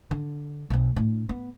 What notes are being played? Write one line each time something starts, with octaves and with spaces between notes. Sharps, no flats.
D3
B1 C4
A2 D4
B3